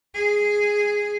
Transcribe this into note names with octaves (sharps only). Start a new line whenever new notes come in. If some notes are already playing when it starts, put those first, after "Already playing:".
G#4